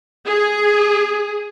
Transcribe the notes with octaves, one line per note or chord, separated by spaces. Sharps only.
G#4